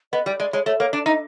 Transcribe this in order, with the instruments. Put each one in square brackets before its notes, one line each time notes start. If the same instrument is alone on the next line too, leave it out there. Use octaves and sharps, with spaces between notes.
[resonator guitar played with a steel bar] B3 [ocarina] D#5
[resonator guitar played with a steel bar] G3 [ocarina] D5
[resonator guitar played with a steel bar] G#3 [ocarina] D5
[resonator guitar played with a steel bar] G#3 [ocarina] C#5
[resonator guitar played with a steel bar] A3 [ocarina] C#5
[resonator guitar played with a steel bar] A#3 [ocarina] C#5
[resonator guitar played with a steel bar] D4 [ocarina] D5
[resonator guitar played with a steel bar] D#4 [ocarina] D#5